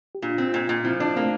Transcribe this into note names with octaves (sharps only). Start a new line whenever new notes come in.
G4
A#2 D4 F4
C4
A#2
A#2
F3 C4 E4
D4
A3 A#3 C4